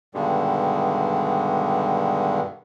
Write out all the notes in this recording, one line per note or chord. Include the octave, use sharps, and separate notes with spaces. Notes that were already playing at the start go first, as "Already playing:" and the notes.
G2 B2 D3 D#3 G3 G#3